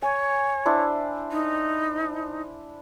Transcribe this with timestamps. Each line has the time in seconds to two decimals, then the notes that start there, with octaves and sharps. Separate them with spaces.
0.02 C#5 G#5
0.66 D4 E4 C5
1.32 D#4